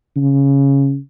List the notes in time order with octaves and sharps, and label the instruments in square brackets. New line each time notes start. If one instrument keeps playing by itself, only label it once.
[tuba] C#3